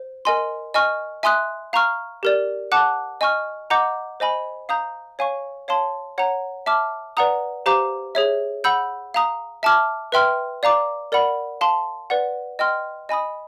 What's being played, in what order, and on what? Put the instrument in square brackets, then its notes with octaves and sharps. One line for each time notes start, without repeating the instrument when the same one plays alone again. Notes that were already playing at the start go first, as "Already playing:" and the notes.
Already playing: [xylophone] C5
A#4 D#5 G#5 C6
D#5 G#5 C#6 F6
E5 G#5 C6 D#6 F#6
F5 A#5 C#6 F6
G4 A#4 D5
F#5 A5 D6 F#6
D#5 G#5 C#6 F6
D#5 F#5 A#5 D6 G6
C5 D#5 G#5 B5
F5 A#5 D#6 G6
C#5 F5 G#5 C#6
C#5 F5 A5 C6
C#5 F#5 A#5
E5 A5 D6 F6
B4 D5 F#5 A#5 D#6
G4 C5 F5 A#5 D6
G#4 C#5 E5
F#5 B5 E6 G6
F5 A#5 D#6
E5 A5 D6 F6
B4 E5 G5 C6 F6
D5 F5 A#5 D6
A#4 D5 F#5 B5
F5 A5 C6
B4 D5 F#5
D#5 G5 C6 F6
D#5 G#5 B5 D#6